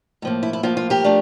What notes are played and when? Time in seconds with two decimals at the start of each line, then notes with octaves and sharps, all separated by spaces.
0.22 A2 F3 A#3
0.43 E4
0.53 E4
0.63 A2 F3 A#3 F4
0.77 F4
0.90 G4 A#4
1.04 F3 A3 D4